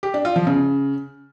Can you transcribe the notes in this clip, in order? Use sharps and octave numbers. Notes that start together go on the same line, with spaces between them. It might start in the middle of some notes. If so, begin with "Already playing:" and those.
G4
D4
F4
F3
C#3